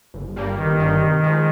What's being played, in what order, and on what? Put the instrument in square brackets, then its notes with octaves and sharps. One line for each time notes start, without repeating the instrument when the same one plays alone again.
[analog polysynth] G1
G2 G3 A#3
[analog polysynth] G1 [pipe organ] D#3
[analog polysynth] G2 G3 A#3
C3
F3 G#3